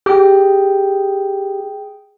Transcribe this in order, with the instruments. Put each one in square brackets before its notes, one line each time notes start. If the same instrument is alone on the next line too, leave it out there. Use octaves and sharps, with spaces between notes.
[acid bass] G4 [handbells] G#4 G5